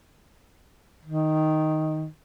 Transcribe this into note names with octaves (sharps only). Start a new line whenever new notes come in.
D#3